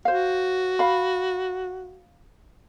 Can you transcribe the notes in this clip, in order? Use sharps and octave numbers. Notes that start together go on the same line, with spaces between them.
F#4 C5 F5
F5 B5